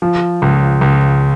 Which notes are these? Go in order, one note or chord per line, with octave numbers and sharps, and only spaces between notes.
F3
C#2
C#2